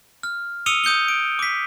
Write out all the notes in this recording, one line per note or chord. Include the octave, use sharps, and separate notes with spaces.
F6
D#6 E6 C#7 D#7 F7 G7
D#6 G6 C#7 G7
D7
D6 B6